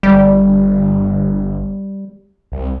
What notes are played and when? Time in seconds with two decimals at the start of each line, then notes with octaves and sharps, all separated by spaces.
0.03 G1 G3
2.52 C2